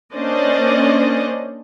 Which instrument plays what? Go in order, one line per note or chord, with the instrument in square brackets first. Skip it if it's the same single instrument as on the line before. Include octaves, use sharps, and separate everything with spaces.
[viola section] A#3 C#4 D4 C5 D5 D#5